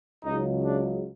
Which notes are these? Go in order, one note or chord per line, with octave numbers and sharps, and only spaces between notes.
C#2 C#3 F#3 D#4
D4